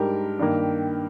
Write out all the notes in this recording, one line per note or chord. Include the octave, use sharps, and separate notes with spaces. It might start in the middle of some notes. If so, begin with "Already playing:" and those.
Already playing: G#2 G3 D4 G4 A#4
G2 D#3 A#3